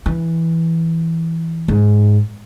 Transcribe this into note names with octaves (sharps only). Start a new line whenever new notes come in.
E3
G#2